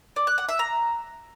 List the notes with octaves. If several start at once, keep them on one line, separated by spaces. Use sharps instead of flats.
D5
F#6
F#5
E5
A#5